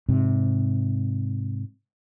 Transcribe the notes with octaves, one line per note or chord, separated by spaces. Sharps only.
G#2 C3